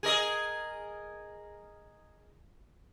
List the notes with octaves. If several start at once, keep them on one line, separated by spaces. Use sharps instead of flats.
G#4 A#4 D#5